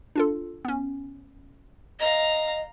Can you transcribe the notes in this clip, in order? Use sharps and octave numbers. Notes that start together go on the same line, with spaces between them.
D4 F4 A4
B3 C#4
D#5 F5 A#5